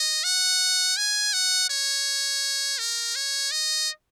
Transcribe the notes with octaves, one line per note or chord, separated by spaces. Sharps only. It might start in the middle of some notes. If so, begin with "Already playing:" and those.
Already playing: D#5
F#5
G#5
F#5
C#5
A#4
C#5
D#5